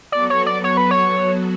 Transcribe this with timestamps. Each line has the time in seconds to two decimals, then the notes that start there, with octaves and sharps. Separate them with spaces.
0.12 F#3 B3 F#4 A4 D5
0.30 C#5
0.46 D5
0.64 C#5
0.77 B4
0.91 C#5